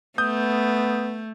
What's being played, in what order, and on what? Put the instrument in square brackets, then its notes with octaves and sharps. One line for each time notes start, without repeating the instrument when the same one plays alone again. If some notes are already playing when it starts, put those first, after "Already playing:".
[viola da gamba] A3 [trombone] B3 [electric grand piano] D#6 G6